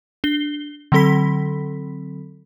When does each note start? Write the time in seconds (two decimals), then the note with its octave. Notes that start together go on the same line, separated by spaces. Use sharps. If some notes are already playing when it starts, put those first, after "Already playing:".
0.24 D4 G7
0.92 D3 F#3 C4 A4 B5 B6